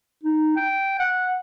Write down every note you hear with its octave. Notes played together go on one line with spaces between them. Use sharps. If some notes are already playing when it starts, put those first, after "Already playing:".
D#4
G5
F#5